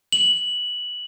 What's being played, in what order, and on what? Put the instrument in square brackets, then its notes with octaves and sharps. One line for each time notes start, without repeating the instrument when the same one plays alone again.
[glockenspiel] F#7